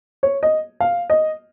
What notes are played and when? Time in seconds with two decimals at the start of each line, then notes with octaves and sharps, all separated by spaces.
0.23 C#5
0.43 D#5
0.81 F5
1.10 D#5